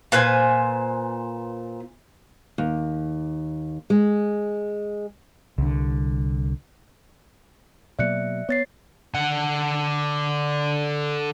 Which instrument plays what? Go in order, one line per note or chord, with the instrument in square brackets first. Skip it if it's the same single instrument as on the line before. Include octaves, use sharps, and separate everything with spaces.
[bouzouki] A#2 B4 C5 G#5
[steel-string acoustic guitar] D#2
G#3
[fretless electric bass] C2 D3
[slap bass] B2 F#3 A#3 [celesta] D5 F#6 C#7 [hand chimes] E5
[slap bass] B3 [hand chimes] C#5 A6 C7
[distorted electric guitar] D3 F#5